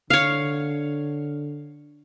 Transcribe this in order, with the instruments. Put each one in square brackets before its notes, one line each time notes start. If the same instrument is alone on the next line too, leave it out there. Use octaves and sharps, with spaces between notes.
[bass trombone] D3 [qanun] C#5 F5